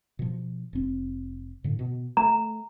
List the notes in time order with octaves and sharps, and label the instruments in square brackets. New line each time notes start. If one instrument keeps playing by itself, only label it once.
[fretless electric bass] B2 F3
F1 C4
A2 D3
B2
[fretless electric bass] A3 [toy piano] A#5